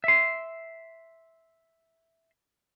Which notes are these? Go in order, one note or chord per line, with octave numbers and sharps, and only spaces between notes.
E5 C6